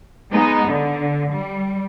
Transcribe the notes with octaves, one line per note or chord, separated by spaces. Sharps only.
G#3 B3 D#4
D3
G3